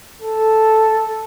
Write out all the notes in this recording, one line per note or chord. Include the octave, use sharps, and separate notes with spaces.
A4